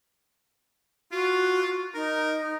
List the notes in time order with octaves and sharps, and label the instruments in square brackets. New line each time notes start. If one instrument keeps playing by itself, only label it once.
[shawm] F4 [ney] F#4
[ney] D#4 [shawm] A#4